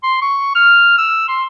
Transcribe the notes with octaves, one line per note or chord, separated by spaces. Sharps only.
C6
C#6
F6
E6
C6